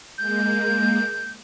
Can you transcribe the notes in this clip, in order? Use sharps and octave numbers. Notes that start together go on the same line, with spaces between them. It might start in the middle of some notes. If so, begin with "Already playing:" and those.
G#3 A#3 G6